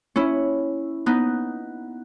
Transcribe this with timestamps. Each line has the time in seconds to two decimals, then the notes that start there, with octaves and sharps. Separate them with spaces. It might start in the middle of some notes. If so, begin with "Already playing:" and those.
0.16 C#4 E4
1.06 B3 D#4